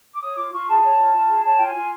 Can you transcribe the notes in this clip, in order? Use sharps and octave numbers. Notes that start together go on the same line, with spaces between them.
D6
C#5 D#6
F4 D6
F4 C#6
G#4 A5
C#5
F4
F4
G#4
C#5 A5
F4 G5
G#5
F4